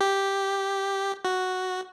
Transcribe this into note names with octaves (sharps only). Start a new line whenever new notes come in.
G4
F#4